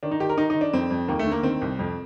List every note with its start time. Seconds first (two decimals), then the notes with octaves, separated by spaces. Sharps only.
0.03 D#3 D4
0.11 D#4
0.20 D#3 G4
0.29 A#4
0.38 D#3 D#4
0.50 D#3 D#4
0.61 D4
0.73 F2 C4
0.91 F2
1.08 D#2 A#3
1.19 A3
1.26 D3
1.32 A#3
1.43 D#3 C4
1.62 C2
1.79 F2